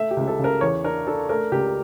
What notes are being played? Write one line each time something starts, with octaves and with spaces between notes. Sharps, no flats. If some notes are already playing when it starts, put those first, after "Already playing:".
Already playing: A3 E5
G4
C#2
A4
C#3
A#4
E2 C#5
D4 A#4
D4 A4
A3 A#4
C#2 G4